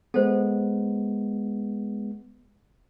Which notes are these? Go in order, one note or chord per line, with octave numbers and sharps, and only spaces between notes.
G#3 B3 A4 C5